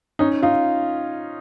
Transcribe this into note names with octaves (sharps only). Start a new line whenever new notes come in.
C#4 D#4
D#4 F4